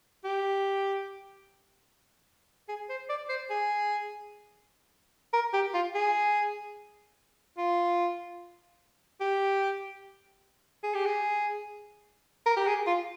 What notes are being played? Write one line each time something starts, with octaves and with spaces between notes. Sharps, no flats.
G4
G#4
C5
D5
C5
G#4
A#4
G4
F4
G#4
F4
G4
G#4
G4
G#4
A#4
G4
G#4
F4